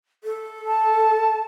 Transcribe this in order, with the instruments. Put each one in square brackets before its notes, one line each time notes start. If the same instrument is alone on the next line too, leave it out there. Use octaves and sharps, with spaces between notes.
[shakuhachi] A4
[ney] A5